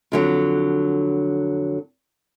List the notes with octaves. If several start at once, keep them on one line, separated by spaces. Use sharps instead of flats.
F2 D3 F#3